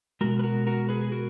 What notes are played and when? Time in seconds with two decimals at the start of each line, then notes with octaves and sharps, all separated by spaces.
0.21 B2 G#3 F#4 A#4
0.39 B4
0.43 F#4 A#4
0.67 F#4 A#4
0.89 G#4 B4
1.01 G#4
1.12 F#4 A#4